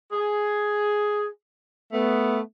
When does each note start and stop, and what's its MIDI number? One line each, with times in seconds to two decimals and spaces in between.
0.12 1.27 68
1.93 2.40 57
1.93 2.40 59